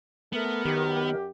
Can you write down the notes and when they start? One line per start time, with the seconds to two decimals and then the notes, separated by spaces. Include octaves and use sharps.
0.33 A3 B3 A#4
0.65 F#2 D#3 G4